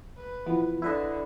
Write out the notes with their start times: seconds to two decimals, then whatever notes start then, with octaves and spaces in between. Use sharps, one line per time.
0.17 B4
0.46 E3 F3 B3
0.82 D3 E4 B4 D#5